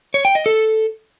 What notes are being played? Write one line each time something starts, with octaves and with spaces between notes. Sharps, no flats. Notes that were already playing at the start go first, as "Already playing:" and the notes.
C#5
G5
D#5
A4